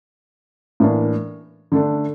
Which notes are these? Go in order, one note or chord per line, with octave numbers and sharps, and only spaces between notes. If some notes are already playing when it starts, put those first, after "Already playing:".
A2 E3 A#3 D4
D3 A3 D4